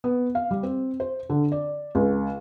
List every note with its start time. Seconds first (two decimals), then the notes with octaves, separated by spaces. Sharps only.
0.04 B3
0.35 F5
0.51 G3
0.63 C4
1.00 C5
1.30 D3
1.52 D5
1.95 C#2